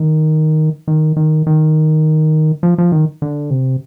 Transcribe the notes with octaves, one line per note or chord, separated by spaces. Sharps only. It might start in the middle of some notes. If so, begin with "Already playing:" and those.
Already playing: D#3
D#3
D#3
D#3
F3
F3
D#3
D3
C3